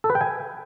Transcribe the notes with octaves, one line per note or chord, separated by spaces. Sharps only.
A4
B4
G5
G#5